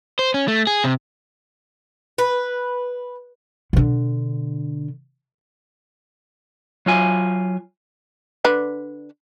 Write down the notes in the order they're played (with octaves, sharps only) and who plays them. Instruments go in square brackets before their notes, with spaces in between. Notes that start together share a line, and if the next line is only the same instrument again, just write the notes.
[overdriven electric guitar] C5
C#4
A3
G#4
C3
[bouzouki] B4
[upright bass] B2 D3
[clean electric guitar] F#3 F4 G#5
[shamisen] D3 D4 B4